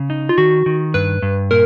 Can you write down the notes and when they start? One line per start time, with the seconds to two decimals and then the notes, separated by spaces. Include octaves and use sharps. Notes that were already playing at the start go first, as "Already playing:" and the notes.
Already playing: C#3
0.10 D#4
0.29 F4
0.38 D#3 F#4
0.66 D#3
0.94 G2 B4
1.22 G2
1.51 A#2 A#4